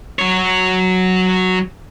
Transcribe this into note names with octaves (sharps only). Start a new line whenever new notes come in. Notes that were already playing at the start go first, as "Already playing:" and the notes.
F#3 C#5